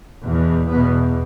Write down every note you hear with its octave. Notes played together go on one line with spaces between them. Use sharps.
E2 B2
E2 B2 B3